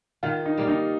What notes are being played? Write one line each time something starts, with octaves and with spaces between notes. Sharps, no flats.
D#3 F4
D#4
G3 A#3
D#4